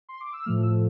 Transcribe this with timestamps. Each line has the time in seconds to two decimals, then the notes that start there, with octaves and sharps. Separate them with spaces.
0.09 C6
0.21 D6
0.33 E6
0.46 A2 F3 A3 F6
0.63 E6